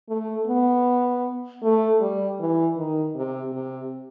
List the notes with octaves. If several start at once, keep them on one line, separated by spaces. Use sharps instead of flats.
A3
B3
A3
G3
E3
D#3
C3
C3